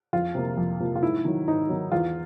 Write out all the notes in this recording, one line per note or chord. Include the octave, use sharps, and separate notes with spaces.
F2 F4
C3 F3 A#3
F2
C3 F3 A#3
F4
G#2 E4
D#3 F#3
G#2 D#4
D#3 F#3
E2 F4